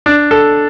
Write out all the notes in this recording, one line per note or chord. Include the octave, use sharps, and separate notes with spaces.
D4
A4